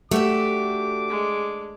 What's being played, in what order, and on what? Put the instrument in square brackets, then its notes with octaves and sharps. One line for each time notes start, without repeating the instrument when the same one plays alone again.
[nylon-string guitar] A3 [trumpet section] D4 D6 [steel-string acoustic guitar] F#4 G4 E5
[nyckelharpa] G#3